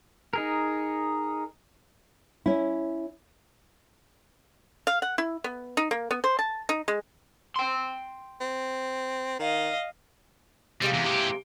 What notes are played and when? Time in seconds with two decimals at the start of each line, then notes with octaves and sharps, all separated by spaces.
0.33 D#4 G#4 A#4
2.46 C#4 E4
4.87 F5
5.02 F#5
5.18 E4
5.44 B3
5.77 D#4
5.91 A#3
6.11 B3
6.24 C5
6.39 A5
6.69 D#4
6.88 G#3
7.56 G5 C6
8.41 C4
9.39 D#3 D#5 F5
10.82 C3 G3 G#3 A#3
10.94 E2
11.06 E3 G4